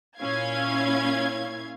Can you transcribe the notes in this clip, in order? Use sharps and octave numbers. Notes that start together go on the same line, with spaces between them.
A#2 C#4 E4 F5 G#6